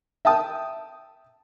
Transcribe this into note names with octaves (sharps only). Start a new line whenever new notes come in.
E5 G5 A5 D#6